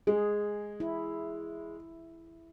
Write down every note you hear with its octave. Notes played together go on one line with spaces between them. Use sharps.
G#3 G#4
E4